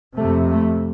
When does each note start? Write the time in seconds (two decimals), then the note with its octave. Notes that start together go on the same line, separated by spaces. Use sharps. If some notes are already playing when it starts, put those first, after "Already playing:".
0.16 F2 C3 A3
0.51 A3